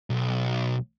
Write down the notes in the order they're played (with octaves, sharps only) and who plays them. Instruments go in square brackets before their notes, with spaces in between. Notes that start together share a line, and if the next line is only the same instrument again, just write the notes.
[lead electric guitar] B1